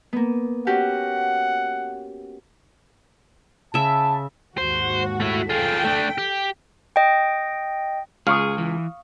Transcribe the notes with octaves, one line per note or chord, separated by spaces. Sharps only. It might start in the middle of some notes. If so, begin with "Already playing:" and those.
A#3 B3
C#4 F#4 G4 F#5
C#3 E5 A5
D#2 G#2 F#4 C5
A3 E4
F4 G#4 A4 G5
A3 D4
G4
D#5 G5
C#2 G#4 F5 C#6 D#6
E3